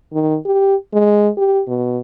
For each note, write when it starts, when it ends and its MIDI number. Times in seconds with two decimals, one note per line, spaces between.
0.13 0.37 51
0.46 0.75 67
0.93 1.29 56
1.37 1.62 67
1.67 1.99 47